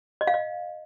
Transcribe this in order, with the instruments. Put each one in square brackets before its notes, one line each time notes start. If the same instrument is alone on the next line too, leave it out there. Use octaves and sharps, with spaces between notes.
[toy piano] D#5
F5
D#5